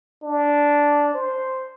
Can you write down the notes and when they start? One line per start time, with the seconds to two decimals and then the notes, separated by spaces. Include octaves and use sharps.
0.23 D4
1.14 C5